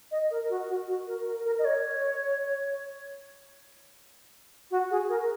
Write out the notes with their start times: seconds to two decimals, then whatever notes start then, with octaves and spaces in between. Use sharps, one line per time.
0.12 D#5
0.31 A#4
0.50 F#4
0.69 F#4
0.88 F#4
1.07 A#4
1.27 A#4
1.45 A#4
1.59 D#5
1.65 C#5
4.71 F#4
4.91 G#4
5.09 A#4